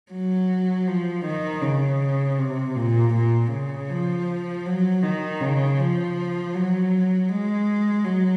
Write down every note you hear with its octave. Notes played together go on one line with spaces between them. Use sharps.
F#3
F3
D#3
C#3
C3
A#2
A#2
C#3
F3
F#3
D#3
C#3
F3
F#3
G#3
F#3